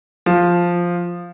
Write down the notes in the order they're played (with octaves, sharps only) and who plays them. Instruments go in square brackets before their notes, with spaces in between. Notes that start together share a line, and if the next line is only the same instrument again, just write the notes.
[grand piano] F3